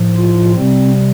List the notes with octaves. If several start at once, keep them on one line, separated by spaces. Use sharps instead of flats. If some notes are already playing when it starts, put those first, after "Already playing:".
Already playing: A2 F3
F4
C3 G3 C4